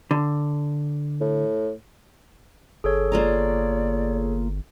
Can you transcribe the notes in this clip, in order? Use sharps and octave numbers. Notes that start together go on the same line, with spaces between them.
D3
A2
G1 G#4 A4 C#5
A#3 F4 D5 A#5